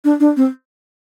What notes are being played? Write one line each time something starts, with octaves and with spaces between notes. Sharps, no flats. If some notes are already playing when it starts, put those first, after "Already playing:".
D4
D4
C4